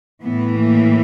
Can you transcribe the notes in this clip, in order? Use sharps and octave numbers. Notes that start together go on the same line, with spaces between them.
A2 E3 B3
A#3